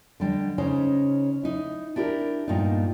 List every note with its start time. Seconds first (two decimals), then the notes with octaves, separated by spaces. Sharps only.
0.20 D3 G3 D4 D#5
0.58 C#3 C#4 D#4 C5
1.43 D#4 E4
1.96 D4 E4 G4 G#4 A#4
2.48 G2 A#2 B3 D#4